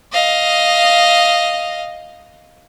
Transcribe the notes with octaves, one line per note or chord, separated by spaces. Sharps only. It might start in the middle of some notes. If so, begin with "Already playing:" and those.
D#5 F5